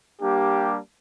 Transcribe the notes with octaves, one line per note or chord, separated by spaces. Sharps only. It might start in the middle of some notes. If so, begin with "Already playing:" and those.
G3 A#3 D4 G4